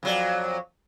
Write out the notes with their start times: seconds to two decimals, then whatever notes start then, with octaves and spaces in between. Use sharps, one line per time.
0.03 F2 F#3 D5